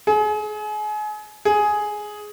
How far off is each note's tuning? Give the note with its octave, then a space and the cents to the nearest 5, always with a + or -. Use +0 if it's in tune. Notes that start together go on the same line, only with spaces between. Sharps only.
G#4 +30
G#4 +5